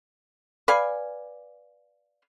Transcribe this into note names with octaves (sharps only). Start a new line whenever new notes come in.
B4 D5 F5 G#5